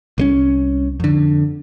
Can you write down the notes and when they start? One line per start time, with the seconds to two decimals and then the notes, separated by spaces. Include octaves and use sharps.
0.18 C2 G#3 C#4
1.00 F2 D3